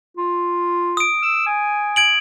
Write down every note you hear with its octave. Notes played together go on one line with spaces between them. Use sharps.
F4
D#6 D7
E6
G#5
G#6 D7 F#7